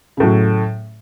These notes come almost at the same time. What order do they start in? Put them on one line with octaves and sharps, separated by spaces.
C#3 A2 F#3